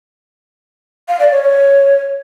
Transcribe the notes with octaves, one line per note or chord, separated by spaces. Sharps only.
F5
D5
C#5
C#5